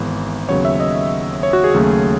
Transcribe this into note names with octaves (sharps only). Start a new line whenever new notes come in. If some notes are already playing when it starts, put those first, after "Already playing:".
Already playing: G#1 G#2 E3 B3
D#2 C#3 F#3 B3 C#5
E5
D#5
C#5
F#4
G#4
D#2 C#3 F#3 A3